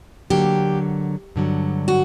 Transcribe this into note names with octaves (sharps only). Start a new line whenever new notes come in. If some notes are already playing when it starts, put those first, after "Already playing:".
D3 F#3 A#3 G4
G2 D3 F#3
F#4